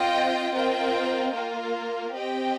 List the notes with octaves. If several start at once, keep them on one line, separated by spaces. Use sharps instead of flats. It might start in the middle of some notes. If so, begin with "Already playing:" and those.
Already playing: C4 F4 D#5 G5
C4 F4 A#4 D#5 G5
A#3 F4 A#4
C4 G4 D#5 G5